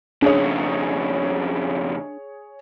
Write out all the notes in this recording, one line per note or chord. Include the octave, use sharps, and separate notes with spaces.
F2 C#3 D4 G#4 C#5